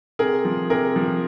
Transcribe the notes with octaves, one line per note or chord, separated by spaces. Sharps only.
C3 G#4 A#4
F3
C3 G#4 A#4
F3